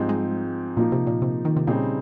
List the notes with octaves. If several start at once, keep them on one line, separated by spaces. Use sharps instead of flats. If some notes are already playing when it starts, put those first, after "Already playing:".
Already playing: G#2 F3 G3 C4 D#4
G#3
A#2 F3 A#3 D#4
C3
A#2
C3
D#3
C3
A#2 C#3 G3 C4 D#4 G#4